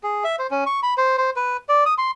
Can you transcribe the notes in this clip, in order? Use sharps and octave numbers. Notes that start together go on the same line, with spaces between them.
G#4
E5
C5
C#4
C#6
B5
C5
C5
B4
D5
D#6
C6